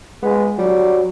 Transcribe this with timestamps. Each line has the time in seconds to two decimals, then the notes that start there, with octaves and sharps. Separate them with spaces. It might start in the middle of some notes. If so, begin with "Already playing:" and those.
0.23 G#3 B3
0.59 F#3 G3